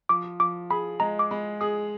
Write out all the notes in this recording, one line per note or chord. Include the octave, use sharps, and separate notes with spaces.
F3 D6
F3 D6
G#4 B5
G#3 A#5
D6
G#3 B5
G#4 D#6